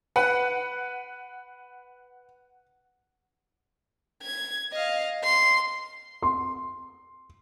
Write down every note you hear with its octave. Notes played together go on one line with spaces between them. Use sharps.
B4 F#5
G#6
D#5 F5
C6
C6